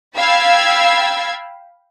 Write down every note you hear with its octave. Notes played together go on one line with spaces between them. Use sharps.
F5 G5 B5 E6 G#6 A6